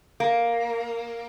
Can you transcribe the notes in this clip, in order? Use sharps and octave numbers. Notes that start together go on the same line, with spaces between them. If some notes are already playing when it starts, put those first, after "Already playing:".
A#3